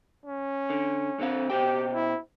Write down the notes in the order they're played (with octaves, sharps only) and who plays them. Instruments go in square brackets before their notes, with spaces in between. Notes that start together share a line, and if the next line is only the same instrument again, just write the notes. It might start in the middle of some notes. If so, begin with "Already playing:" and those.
[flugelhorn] C#4
[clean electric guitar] D3
D3 C4 F5
[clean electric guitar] B2 C5 G5 [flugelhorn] G4
[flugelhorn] E4